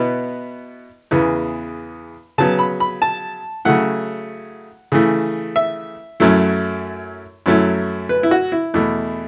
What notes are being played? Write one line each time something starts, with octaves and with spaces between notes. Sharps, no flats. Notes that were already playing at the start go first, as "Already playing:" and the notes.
Already playing: B2 B3 E4
E2 C#3 E3 B3
C#3 F#3 B3 A5
B5
B5
A5
C#3 F#3 A3 E4 F#5
C#3 E3 A3
E5
F#2 F#3 A3 E4
F#2 F#3 A3 E4
B4
E4
F#4
E4
E2 B2 A3